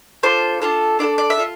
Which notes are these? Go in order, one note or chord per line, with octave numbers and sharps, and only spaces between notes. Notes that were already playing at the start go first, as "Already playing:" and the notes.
D4 F4 A4 C5
D4 F4 A4
D4 F4 A4 D5
D5
E5
F4 A4